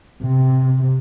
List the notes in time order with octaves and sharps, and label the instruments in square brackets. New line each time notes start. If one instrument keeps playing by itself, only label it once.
[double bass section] C3